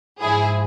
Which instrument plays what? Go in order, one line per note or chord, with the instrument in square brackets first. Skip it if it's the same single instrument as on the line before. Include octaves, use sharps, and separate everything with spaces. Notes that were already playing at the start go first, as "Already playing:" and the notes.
[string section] G#2 F3 E4 G#4